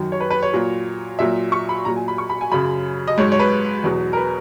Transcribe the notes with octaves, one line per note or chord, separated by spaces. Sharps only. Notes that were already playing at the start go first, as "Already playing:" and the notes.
Already playing: F#2 D#3 F#3
C#5
B4
B4
C#5
A#2 F#3
A#2 F#3 E5
C#6
B5
A#2 F#3 A#5
G#5
B5
C#6
B5
G#5
F#2 C#3 F#3 B5
D#5
G#2 F#3 C#5
C#5
B4
E2 B2 F#3
A#4
B4